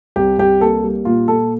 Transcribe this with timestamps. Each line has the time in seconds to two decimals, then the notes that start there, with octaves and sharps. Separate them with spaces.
0.16 C2 G4
0.38 C2 G4
0.61 A#3 A4
0.84 G3
1.05 A#2 F4
1.28 A#2 A4